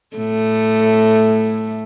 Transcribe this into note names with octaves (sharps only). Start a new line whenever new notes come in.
A2 A3